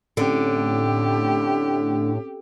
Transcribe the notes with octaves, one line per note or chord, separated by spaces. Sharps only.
A2 D3 C4 C#4 G4 A4